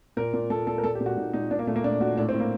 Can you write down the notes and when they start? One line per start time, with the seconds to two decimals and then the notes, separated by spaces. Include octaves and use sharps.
0.17 A#2 A#4
0.34 A#2
0.50 A#2 A4
0.67 A#2 A4
0.78 A#4
0.84 A#2 A4
0.95 G4
1.01 A#2
1.06 F#4
1.17 A#2 D#4
1.33 A#2 D#4
1.51 A#2 D4
1.59 A#3
1.67 A#2 A3
1.76 A#3
1.84 A#2 D4
2.01 A#2 F#4
2.18 A2 D4
2.29 C4
2.34 A2
2.40 A#3